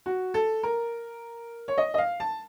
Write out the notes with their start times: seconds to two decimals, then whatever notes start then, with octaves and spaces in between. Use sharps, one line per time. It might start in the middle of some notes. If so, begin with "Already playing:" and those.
0.06 F#4
0.34 A4
0.63 A#4
1.68 C#5
1.78 D#5
1.94 D#5
1.98 F5
2.20 A5